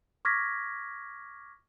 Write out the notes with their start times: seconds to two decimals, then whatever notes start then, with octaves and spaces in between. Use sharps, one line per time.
0.25 C#6 D6 F6 G#6 A#6 B6